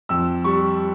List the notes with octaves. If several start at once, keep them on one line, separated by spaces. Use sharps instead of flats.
F2 E6
G3 C#6